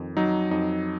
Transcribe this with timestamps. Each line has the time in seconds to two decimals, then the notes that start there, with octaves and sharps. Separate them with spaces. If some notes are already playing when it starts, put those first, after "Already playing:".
Already playing: F2 D#3
0.17 F#3 D#4
0.51 F2 D#4